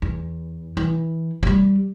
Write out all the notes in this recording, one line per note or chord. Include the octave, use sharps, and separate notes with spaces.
E2
E3
F#3 G3